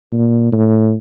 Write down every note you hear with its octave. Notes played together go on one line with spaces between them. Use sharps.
A#2
A2